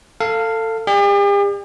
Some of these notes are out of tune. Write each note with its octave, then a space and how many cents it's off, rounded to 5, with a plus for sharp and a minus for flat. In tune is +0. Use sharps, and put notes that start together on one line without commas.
A4 +25 F5 -5
G4 +45 D5 +25